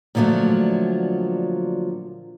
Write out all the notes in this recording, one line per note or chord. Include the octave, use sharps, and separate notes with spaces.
A#2 D3 F3 F#3 A3